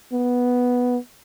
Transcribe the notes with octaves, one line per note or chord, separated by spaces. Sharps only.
B3